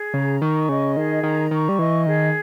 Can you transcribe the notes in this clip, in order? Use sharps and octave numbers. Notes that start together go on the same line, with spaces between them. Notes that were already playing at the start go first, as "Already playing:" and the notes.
Already playing: G#4
C#3 A#5
D#3 C#6
C#3 D#5
D#3 G#4
D#3 A#5
D#3 C#6
G3
E3 D#5
D#3 G#4